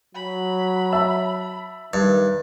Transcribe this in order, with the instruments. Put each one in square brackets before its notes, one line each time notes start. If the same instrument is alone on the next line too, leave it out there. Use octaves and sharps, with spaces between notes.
[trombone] F#3 [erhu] B5
[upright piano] E5 A5 E6
[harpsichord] G2 [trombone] D#3